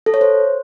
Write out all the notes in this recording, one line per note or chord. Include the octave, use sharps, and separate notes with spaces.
A4
C#5
C5